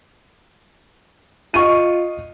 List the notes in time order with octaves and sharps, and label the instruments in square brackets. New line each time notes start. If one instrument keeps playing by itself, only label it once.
[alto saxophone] F4 [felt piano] D#5 C#6 D#7